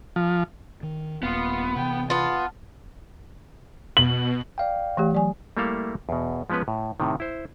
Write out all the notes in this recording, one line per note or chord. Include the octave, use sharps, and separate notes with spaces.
F3
D#3
D#1 A#3 B3 F4
C3 E3 G5
B3 F4 A5
B2 F#7
D5 F5 G5
E3 A3 G4
F#3 D5 G#5
G3 A3 A#3 E4 A4 F5
E2 B2
F3 G#3 B3 C#4 B4
A2
A2 C3 D#3
E4 C5